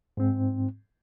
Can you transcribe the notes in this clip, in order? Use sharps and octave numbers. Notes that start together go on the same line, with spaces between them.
G#2 C4